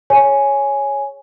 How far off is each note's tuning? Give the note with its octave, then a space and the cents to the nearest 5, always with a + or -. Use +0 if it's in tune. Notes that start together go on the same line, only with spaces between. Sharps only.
G#4 +0 C#5 +0 G#5 +0